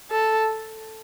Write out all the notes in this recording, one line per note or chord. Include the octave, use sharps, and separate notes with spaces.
A4